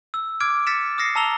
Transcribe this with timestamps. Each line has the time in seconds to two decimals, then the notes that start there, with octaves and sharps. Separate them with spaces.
0.14 E6
0.40 D6 F6 G#6 D7
0.67 F6 A6 B6 C#7 E7
0.98 D#6 F6 A#6 C7 C#7
1.15 A5 A#5 E6 F7 G7